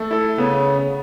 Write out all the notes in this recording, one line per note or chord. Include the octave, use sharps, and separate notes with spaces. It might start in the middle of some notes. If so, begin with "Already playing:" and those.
Already playing: A3 A4
E4 A4
C#3 B3